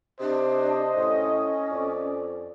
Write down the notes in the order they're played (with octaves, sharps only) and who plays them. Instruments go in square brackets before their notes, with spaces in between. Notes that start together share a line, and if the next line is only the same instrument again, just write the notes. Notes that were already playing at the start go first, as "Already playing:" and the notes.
[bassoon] C3 [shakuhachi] D4 [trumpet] C5 [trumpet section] D#5
[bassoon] A2 [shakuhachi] C#4
[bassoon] F2 [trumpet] D5